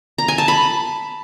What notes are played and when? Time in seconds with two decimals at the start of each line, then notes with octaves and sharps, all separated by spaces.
0.18 A#5
0.28 G#5
0.38 A5
0.48 B5